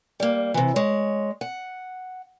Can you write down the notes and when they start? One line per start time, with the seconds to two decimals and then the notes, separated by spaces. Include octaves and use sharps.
0.20 G3 A#3
0.54 C3 E3
0.76 G#3 C#5
1.41 F#5